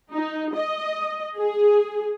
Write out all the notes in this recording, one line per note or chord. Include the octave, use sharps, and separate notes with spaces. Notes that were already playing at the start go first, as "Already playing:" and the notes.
D#4
D#5
G#4